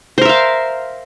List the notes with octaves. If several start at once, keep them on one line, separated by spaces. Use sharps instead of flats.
A#4 C5 E5 F5